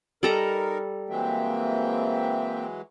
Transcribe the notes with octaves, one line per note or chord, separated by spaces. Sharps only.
G3 D#4 A4 A#4 A#5
E3 F#3 G#3 A#3 C4 E5 G5